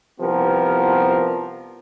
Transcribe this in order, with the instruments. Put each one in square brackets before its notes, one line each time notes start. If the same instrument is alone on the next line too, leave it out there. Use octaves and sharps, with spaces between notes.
[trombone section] C2 F3 B3 G4 A#4